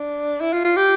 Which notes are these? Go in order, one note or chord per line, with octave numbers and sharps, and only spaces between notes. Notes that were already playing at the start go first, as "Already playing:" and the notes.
Already playing: D4
E4
F4
F4
G4